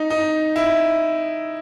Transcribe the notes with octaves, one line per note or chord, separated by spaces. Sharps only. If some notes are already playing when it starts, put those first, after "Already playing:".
Already playing: D#4
D#4
E4